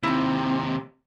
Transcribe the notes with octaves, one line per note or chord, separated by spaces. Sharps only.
D#2 C3 C4 D#4 E4